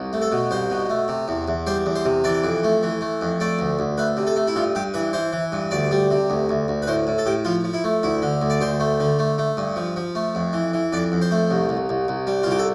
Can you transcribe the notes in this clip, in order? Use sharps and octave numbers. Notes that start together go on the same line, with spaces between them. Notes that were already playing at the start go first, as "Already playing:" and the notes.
Already playing: C2
A3
A4
B2
C2 C5
B2
A3
C3
E2
E2
G3 C5
E2
C5
C3
E3 D5
F2
A3
E3
A3
F2
A3 D5
D2
D2
A3 B4
C3
A4
A3
E4
G2 F4
G2 G4
E3 B4
E3 C5
E3
G2
D2 D5
G3
C3
D2
D2
D2
B4
A2 C5
A2
A4
A2 G4
F3 F4
F3
E4
A3
D2 E4
D3
D2
D5
D2 C5
A3
D3
A3
A3
G2
F3
F3
A3
F2
E3
E3
F2 D5
F2
C5
A3
C2
C2
C2
C2
G3
F4
C2 G4
A4